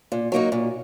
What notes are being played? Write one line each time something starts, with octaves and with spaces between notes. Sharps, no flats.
A#2
F#3 A#3 D#4 F#4
A#2